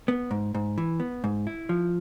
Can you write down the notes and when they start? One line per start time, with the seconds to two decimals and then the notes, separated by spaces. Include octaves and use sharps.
0.08 B3
0.31 G#2
0.54 G#2
0.78 E3
1.00 B3
1.24 G#2
1.47 E4
1.69 F3